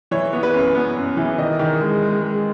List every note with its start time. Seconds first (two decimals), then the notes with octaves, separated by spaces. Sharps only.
0.11 E3 C#5
0.33 B3
0.43 B4
0.54 F#2
0.75 B3
0.96 F#2
1.17 E3
1.38 D#3 D#5
1.59 D#3
1.81 G#3
2.02 G#3
2.22 G#3